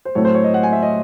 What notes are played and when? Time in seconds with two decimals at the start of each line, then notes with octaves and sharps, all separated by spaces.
0.05 C5
0.15 A2 F#3 A3 C4 C#5
0.25 C5
0.35 C#5
0.44 D#5
0.54 F#5
0.63 G#5
0.73 E5
0.83 D#5